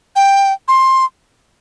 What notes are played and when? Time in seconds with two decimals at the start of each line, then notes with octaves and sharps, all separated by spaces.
0.16 G5
0.68 C6